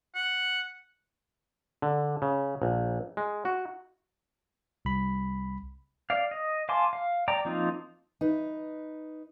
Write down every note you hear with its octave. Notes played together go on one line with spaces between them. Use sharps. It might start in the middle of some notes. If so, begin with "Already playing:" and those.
F#5
D3
C#3
A#1
G#3
F#4
C2 B5
D5 F5
D#5
F5 G#5 A5 C6 D6
F5
D5 G5 A#5
F3 A#3 C4 D#4 F4
D#4 B4